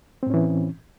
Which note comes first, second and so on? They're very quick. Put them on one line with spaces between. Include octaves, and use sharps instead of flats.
C4 A2 C#4 E3